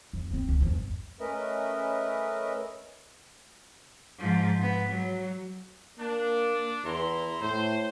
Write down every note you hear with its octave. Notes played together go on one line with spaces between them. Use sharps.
F2
A#3 C4
D2
G1 E2
A3 C#4 A#4 B4 D#5 E5
G#2 F3
G#2 B3
F#3
A#3 D4
E2 E4 A#5 C6
A2 C5